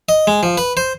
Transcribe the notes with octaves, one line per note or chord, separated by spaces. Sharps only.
D#5
G#3
F3
B4
C5